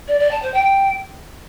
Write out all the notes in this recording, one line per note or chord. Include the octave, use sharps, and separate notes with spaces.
D5
D5
A5
C5
G5